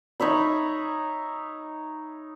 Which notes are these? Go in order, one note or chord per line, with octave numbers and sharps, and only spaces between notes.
D#4 C#5 E5 B5